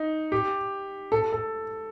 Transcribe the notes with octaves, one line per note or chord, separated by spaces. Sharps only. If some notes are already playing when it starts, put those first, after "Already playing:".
Already playing: D#4
G4
A4
A4